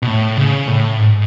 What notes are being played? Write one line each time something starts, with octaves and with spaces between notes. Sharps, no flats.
B2
A2
C#3
A2
G#2